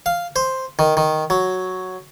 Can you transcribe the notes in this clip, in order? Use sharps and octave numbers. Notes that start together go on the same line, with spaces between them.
F5
C5
D#3
D#3
F#3